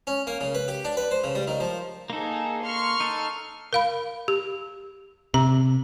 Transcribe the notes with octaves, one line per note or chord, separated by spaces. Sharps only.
C#4
A#3
C#3
B4
G4
D4
B4
C5
C#3
G3
D#3
F3
A#3 D#4 G#4 A4
C6 C#6 F6
D#4 A4
A#4 F5 B5
G4
C3 A#5